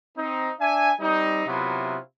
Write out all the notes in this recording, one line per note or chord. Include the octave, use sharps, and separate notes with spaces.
C4 D#4
D4 E5 G#5
G3 C4 D#4
C3 F#3 B3 E4 F4